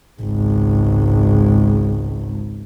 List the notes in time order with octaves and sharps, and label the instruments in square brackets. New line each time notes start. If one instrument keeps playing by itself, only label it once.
[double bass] G#1 C#2